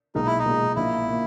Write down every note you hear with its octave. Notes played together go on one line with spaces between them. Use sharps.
B1 A#2 G#3 D#4
E4
D#4
B1 A#2 G#3
A#1 A#2 A#3 E4
A#2 A#3